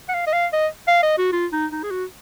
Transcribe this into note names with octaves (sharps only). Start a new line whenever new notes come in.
F#5
F5
D#5
F5
D#5
F5
D#5
F#4
F4
D#4
D#4
G#4
F#4